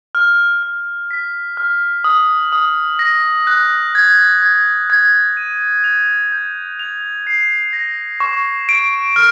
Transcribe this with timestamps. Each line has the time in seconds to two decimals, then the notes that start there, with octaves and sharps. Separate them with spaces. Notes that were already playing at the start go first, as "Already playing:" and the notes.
0.15 F6
0.63 F6
1.11 B6
1.57 F6
2.04 D#6
2.52 D#6
2.99 A#6
3.47 F#6
3.95 G#6
4.42 G#6
4.90 G#6
5.37 D#7
5.84 F7
6.32 G6
6.79 F7
7.27 C7
7.73 A#6
8.20 C#6
8.69 D7
9.16 F6